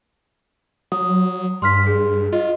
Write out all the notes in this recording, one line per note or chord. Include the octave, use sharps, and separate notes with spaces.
F#3 D#6
G2 C6 F6 B6
G#4
F4 D#5